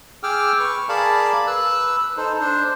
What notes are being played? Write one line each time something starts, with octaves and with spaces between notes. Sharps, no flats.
G#4 G5 D6 E6 F6
B4 C#6
G#4 A#4 D5 F5 A5 B5
B4 E6 F#6
D#4 A4 C5
D4 C5